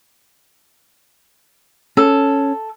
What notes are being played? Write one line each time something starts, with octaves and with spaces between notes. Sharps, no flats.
C#4 A4